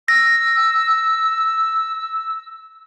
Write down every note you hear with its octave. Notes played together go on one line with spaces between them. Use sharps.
E6 A#6